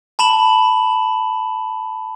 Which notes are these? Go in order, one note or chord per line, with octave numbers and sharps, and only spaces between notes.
A5 B5 E7 F#7